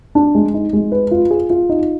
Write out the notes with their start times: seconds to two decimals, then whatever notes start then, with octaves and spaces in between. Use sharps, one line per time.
0.15 D4
0.35 G#3
0.54 D#4
0.73 G#3
0.92 B4
1.11 F4
1.31 G#4
1.50 F4
1.69 D#4